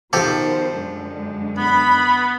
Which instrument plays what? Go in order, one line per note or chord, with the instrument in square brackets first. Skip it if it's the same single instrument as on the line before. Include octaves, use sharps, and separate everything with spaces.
[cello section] B2 D#3 C5 [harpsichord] F3 G4 A4
[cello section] F#2 D3 G#3
[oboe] B3 [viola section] B5